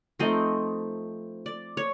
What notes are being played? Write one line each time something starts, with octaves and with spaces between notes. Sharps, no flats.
F3 A3 C4 D#4 D#5
D5
C#5